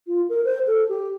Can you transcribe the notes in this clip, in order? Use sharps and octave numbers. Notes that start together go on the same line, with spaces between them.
F4
A#4
C5
A4
G4